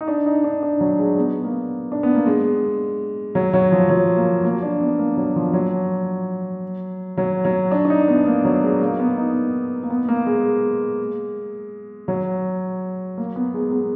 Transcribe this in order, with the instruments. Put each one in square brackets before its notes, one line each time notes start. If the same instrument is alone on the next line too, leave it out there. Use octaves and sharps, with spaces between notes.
[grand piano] D#4
D4
D#4
D4
D4
F#3
G#3
B3
A#3
D4
B3
A#3
G#3
F#3
F#3
F3
F#3
A#3
A#3
D4
B3
A#3
F#3
F3
F#3
F#3
F#3
D4
D4
D#4
B3
A#3
F#3
G#3
A#3
B3
D#4
A#3
B3
A#3
G#3
F#3
A#3
B3
G#3
B3